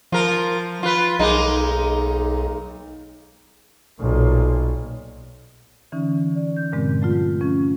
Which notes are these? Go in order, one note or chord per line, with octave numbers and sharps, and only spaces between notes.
F3 F4 A#4
F4 B4
B1 G#3 A#3 D#4
B1 A#2
D3 E3 C#4 D#4
D5
G6
G2 A#2 D3 G#3 C4
F#3 A3 F4
F3 C#4